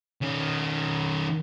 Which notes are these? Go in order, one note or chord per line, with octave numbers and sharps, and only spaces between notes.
D#3 C#4